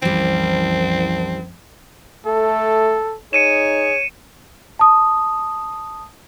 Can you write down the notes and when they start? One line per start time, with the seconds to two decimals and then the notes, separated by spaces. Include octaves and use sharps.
0.02 C2 F#2 E3 F3 G3 C4
2.26 A3 A4
3.33 D#4 G#4 C#5 C#7 D#7 E7
4.79 A5 D#6